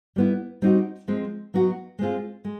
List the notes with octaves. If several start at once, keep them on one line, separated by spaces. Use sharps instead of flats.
G3 B3 E4
G3 C4 D#4 F#4
F3 G#3 C4
F#3 B3 D#4 F#4
G#3 C4 F4 G#4
G#3